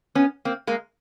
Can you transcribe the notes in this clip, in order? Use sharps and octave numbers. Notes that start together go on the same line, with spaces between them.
B3 C#4
A#3 C4
G#3 A#3